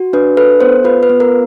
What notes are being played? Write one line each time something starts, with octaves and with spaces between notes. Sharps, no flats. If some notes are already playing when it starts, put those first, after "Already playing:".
Already playing: F#4
D4 B4
A4 B4
B3 C5
F4 B4
B4
B3
A#4